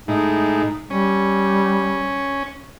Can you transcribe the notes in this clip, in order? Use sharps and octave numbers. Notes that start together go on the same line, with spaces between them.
A2 G#3 D#4
G3 C#4